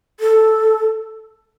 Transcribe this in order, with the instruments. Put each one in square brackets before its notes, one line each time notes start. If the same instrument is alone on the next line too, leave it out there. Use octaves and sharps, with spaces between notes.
[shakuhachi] A4